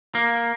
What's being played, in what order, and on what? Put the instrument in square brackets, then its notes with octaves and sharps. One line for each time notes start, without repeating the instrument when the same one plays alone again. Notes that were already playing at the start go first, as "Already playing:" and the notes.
[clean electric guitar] A#3